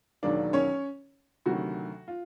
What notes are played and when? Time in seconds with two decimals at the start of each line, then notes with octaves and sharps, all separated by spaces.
0.23 E1 D#2 D#3 F#3 A#3 D4 D5
0.53 C#4 C#5
1.46 D2 C3 D#3 F#3 F#4
2.08 F4